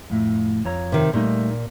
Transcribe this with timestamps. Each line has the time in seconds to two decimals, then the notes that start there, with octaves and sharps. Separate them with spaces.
0.10 F2 A2
0.65 F2 C#5 A#5
0.92 C3 D#3
1.13 A#2 G3 A3 D#4